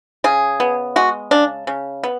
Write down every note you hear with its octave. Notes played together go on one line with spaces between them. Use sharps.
C#3 G#4
B3
G#3 F#4
C#3 D4
C#3
B3